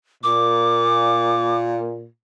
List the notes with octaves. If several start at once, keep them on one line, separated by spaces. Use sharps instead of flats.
A#2 D6